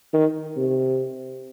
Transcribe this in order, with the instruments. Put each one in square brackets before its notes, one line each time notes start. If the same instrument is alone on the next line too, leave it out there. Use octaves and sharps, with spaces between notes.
[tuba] D#3
C3